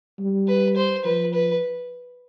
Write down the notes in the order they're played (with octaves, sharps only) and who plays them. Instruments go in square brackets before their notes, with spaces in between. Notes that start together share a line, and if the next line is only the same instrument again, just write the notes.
[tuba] G3
[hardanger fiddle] B4
C5
[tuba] F3 [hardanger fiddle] B4
[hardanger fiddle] B4